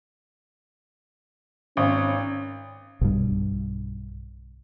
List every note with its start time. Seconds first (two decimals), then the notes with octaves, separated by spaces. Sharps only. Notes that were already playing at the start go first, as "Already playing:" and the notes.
1.77 G#1 C#4
3.01 B1 G2